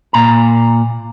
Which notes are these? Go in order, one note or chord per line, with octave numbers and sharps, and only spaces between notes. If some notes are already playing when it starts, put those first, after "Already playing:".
A#2 A#5